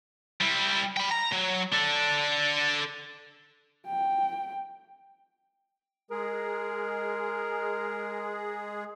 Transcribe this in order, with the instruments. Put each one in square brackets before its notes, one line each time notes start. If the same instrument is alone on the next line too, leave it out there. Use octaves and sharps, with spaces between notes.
[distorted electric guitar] G3 E4
G5 B5
A#5
F#3
D4 A4
[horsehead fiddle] G5
[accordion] G#3 G#4 [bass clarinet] A#4